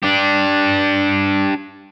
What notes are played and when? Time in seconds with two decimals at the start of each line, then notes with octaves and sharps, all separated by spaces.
0.03 D4 G4